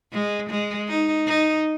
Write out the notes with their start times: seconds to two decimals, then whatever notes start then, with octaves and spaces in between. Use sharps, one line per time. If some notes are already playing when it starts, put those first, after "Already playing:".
0.13 G#3
0.50 G#3
0.89 D#4
1.27 D#4